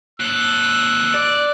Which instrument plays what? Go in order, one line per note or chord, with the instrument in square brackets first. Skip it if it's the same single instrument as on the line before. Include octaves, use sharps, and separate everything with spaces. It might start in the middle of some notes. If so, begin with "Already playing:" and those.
[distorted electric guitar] D#2 A4 [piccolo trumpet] E6 [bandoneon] F#6
[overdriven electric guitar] D5